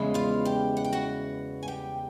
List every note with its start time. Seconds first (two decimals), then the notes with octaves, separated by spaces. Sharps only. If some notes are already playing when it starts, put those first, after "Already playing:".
Already playing: E2 C#3 E3 G#3
0.14 F4 F5
0.45 G4 G5
0.77 F#5
0.84 G5
0.93 F#4 F#5
1.63 G#5
1.68 G4 G5